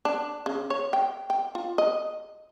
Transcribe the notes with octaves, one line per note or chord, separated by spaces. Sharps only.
D4
C#3
C#5
G5
G5
F4
D#5